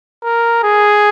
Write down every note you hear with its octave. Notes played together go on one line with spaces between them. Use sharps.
A#4
G#4